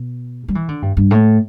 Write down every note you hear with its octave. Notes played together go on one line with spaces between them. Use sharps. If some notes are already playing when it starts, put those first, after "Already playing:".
Already playing: B2
G3
E3
D3
G2
G2
A2